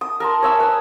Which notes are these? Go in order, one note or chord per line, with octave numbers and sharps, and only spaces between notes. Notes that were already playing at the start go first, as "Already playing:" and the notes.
D#6
A#4 A5 C6
C#5 E5 G#5
B4 D#6